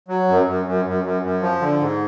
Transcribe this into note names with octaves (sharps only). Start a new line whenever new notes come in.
F#3
F#2
F#2
F#2
F#2
F#2
F#2
F3
D3
G#2